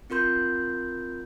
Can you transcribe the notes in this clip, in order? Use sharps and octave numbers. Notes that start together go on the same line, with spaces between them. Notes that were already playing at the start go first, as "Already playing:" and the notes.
C4 F4 A#4 C6 G6